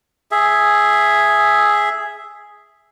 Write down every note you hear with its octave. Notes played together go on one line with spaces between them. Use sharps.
G#4 E5